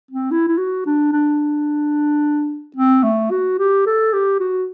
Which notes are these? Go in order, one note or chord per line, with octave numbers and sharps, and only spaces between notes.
C4
E4
E4
F#4
D4
D4
C4
A3
F#4
G4
A4
G4
F#4